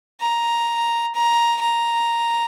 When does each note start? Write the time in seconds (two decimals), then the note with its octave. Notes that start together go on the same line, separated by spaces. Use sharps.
0.21 A#5
1.14 A#5
1.61 A#5